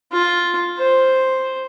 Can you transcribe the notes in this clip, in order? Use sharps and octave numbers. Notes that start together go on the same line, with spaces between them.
F4
C5